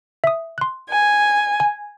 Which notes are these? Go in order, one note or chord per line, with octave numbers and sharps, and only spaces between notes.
E5 D#6
C6 F#6
G#5
G#5